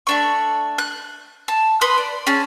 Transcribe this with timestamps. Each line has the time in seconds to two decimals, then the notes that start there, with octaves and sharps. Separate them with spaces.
0.07 A3 D4 C#6
0.78 F#6
1.48 A5
1.81 B4 C6 D#6
1.98 D5
2.27 C#4 G#4 A5